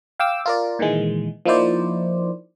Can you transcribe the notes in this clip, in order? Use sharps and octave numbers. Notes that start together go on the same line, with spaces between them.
F5 G5 D6 E6
F4 A#4 D5
A#2 D#3 E3 G#3
F3 A#3 D#4 E4 C5 D5